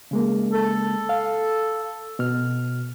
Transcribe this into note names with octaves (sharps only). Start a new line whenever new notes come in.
C#3 G#3 A#3
A4
F5
B2 F6